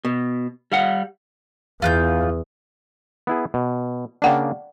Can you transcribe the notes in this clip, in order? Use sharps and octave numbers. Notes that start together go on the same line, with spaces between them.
B2
G3 F5 F#5
E2 F4 F#6 G6
B3 E4 G#4
B2
C#3 A#3 D4 D5 F#5 G5